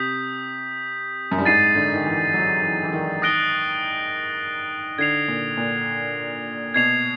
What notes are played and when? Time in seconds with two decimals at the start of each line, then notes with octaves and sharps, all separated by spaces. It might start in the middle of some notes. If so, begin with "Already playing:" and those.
Already playing: C3 D#6 G6 B6
1.31 F#2
1.38 G2
1.45 G#2 A6 C7 D#7
1.75 D3
1.94 D#3
2.05 E3
2.34 F#3
2.63 E3
2.83 E3
2.93 D#3
3.22 D#6 F#6 A#6 D7 G7
4.98 D3 G#6 C7 F7
5.28 A#2
5.57 A#2
6.74 B2 G#6 C7 F7